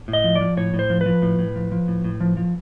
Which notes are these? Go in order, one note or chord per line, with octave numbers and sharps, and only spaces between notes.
A2
D#5
F3
D5
F3
A2 C#5
A2
C5
F3
B4
F3
A2
A2
F3
F3
A2
A2
F3
F3